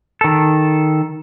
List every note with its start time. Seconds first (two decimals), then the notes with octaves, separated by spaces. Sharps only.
0.21 D#3 A4